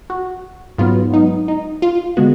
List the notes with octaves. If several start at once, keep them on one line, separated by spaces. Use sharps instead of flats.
F#4
G#2 F#3 B3 F4
D#4
D#4
F4
D3 G#3 B3 F#4